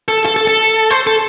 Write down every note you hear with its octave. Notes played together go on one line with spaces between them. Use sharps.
A4
A4
A4
A4
C5
A4